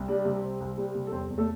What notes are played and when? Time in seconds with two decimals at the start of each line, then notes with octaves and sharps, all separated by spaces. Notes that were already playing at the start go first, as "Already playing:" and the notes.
Already playing: C2
0.08 G3 D4 D5
0.25 C3
0.43 C4
0.60 C2
0.78 G3
0.95 C3
1.07 A4
1.12 E2 C4 C5
1.30 E2
1.38 A3 A4